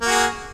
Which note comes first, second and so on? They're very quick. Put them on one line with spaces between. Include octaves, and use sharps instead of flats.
A#3 F#4 G#4